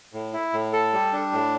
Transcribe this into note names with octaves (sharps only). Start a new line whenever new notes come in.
A2
E4
A2
A4
G3
D4
A2